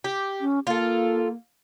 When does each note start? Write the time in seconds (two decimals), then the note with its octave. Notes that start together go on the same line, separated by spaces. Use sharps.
0.04 G4
0.41 C#4
0.67 A#3 F4 A4